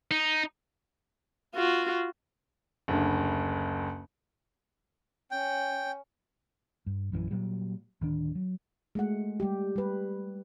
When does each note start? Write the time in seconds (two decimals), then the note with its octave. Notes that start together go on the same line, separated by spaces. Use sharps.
0.11 D#4
1.55 F4 F#4
2.88 F#1 D2
5.31 C#4 G5
6.86 G2
7.12 A#1 F#2 E3 F#3
7.31 A#2 F#3 G3
8.01 D1 D#3 D4
8.35 F#3
8.95 G#3 A3 F#5
9.40 G3 G4
9.76 G3 B4